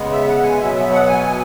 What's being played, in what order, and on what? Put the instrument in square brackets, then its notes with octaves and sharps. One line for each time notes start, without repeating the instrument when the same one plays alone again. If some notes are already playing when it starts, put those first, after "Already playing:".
Already playing: [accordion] C#3 G#3 B3
E5
F#5
G#5
B2 F#3 B3 E5
E5
F#5
G#5